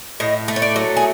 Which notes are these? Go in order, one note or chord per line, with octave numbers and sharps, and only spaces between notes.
A2 D#5
A3
C#5
D5
F#3
G#4